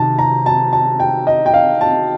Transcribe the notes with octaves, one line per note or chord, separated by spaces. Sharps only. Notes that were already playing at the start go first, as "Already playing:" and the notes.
Already playing: C3 D#3 A5
A#5
A5
A5
G5
D#5
G5
F5
A5